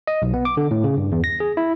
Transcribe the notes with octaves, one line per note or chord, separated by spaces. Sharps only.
D#5
B1
B3
D6
D3
A2
C#3
G2
E2
A#6
G#4
E4